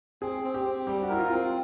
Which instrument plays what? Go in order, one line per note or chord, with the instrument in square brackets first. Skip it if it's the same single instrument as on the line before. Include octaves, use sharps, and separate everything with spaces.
[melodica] C4 [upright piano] G#4
[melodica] C4
[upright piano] G4
[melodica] C4
[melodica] G3 [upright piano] G4
[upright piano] F#4
[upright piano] E4 [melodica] A#4
[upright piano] F4
[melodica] C4 [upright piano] F4